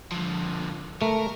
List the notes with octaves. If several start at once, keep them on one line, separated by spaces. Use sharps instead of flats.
D3 F3
A3 A#4